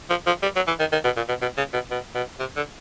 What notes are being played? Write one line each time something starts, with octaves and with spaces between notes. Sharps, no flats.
F3
F3
G3
F#3
E3
D#3
D#3
B2
A#2
B2
B2
C#3
B2
B2
B2
C3
D3